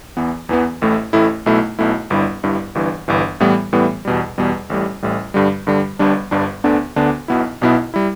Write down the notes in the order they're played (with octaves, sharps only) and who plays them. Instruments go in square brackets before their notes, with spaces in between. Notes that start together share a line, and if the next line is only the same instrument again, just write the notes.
[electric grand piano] E2 E3 B3
E2 E3 B3
A1 A2 A3 E4
A1 A2 A3 E4
B1 B2 A3 E4
B1 B2 A3 E4
G1 G2 G3 E4
G1 G2 G3 E4
G1 G2 E3
G1 G2 E3
A2 E3 G3 B3
A2 E3 G3 B3
E2 B2 G3
E2 B2 G3
A1 A2 G3
A1 A2 G3
G2 D3 G3
G2 D3 G3
G1 G2 G3 D4
G1 G2 G3 D4
D2 D3 B3 D4
D2 D3 B3 D4
B1 B2 B3 E4
B1 B2 B3 E4
G3 E4